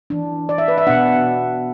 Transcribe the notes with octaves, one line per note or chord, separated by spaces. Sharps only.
E3 D4
D5
E5
B4
E5
B2 B3 D4 F#5